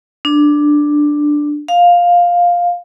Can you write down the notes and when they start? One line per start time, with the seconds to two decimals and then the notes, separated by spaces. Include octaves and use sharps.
0.25 D4
1.68 F5